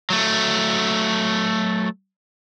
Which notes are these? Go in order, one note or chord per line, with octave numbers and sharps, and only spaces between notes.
F#3 A3